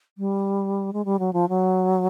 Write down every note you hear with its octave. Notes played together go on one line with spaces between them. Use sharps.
G3
G#3
G3
F#3
F3
F#3